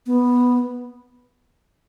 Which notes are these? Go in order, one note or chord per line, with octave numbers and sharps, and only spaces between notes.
B3